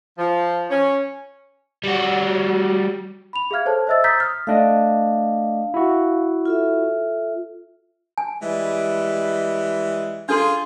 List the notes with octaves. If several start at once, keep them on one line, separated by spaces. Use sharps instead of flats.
F3
C#4
G3 F#4
B5 F7
G#4 E5 F5 F6 G#6
A4 C5 C#5 A5
C5 D#5 E5 E6 A6
A#5 D#6 E6 G6 A6 B6
D#6 F6
A3 D4 D#5 F5
E4 F#4
F4 A4 E5
G#5
E3 G3 G#3
D4 F4 G#4 A4 C6